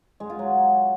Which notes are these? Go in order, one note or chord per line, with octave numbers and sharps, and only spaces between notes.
G#3
F4
F#3